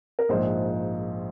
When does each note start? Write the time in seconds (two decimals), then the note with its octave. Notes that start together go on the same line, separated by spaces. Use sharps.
0.19 A#4
0.29 A#1 G#2 F3 C5